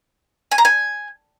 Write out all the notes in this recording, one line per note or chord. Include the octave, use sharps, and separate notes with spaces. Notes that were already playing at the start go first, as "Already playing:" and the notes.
G#5
A#5
G#5